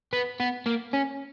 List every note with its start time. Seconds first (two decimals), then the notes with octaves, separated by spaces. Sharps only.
0.13 B3
0.40 B3
0.66 A#3
0.93 C#4